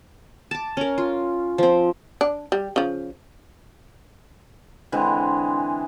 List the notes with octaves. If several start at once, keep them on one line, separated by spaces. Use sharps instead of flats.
A5 D6
C#4 A#4
F4
F3 C4
D4
G3
C#3 F3
D3 E3 G#3 C4